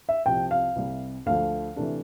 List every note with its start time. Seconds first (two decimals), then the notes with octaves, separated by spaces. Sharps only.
0.09 E5
0.26 C2 C3 F3 G5
0.51 F5
0.76 C2 C3 G3
1.26 D2 D3 F3 A3 F5
1.76 C3 E3 A3 D4